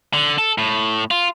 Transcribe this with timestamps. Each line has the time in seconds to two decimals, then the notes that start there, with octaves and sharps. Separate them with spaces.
0.14 D3
0.38 A4
0.58 A2
1.11 F4